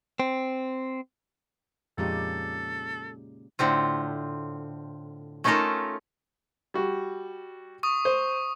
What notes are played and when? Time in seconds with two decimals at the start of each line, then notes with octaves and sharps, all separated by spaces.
0.20 C4
1.98 F2 A#2 C#3 G#3 D#4 G4 A4
3.59 A2 D3 C4 F4
5.44 A3 C#4 D#4 F4 A4 A#4
6.74 G3 F#4
7.83 C#6 D#6
8.05 C5